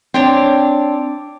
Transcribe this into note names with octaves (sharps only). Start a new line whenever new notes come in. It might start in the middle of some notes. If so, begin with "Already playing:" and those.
C4 D4 C#5